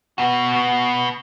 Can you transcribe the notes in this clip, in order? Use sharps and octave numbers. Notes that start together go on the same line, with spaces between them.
B2 F#4